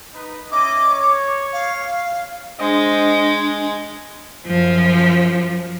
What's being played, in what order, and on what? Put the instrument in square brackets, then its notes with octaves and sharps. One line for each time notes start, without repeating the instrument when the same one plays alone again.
[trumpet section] D#4 B4
[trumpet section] C#4 E4 D#5 [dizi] D6
[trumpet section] C#5
[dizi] F5
[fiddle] G#3 [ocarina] D4 [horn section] C5 D#5
[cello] F#2 F3